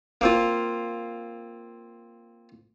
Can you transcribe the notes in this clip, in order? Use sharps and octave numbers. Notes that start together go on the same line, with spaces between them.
A#3 C4 F4